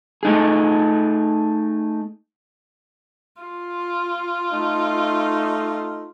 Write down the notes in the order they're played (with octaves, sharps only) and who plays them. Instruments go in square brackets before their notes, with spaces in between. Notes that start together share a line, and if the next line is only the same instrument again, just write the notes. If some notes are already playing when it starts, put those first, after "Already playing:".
[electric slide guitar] A3 D#4 G#4
[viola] F4
[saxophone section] A3 D#4